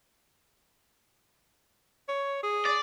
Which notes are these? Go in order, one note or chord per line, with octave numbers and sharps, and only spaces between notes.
C#5
G#4
D5